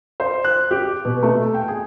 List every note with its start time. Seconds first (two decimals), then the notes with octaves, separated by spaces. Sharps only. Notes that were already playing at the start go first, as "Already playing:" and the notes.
0.20 C5
0.44 F#6
0.71 G4
1.05 B2
1.23 A3
1.54 G5
1.68 G#4